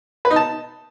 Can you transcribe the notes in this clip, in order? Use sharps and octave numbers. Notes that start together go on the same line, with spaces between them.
B4
D#4
A5